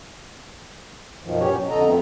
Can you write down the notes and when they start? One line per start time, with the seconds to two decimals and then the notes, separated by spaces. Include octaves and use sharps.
1.24 F#2 B2 D#3 F3
1.40 A#2 F#3 C#4 G4 C#5
1.55 B2 F#3
1.70 F2 D3 A4 D#5 A#5
1.85 F2 F3 A3 B3 C4